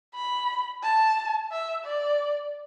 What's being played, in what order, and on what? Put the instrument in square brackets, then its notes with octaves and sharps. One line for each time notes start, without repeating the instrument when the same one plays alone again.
[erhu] B5
A5
E5
D5